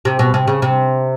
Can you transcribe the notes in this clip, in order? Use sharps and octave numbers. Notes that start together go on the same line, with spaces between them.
C3
B2
C3
C#3
C3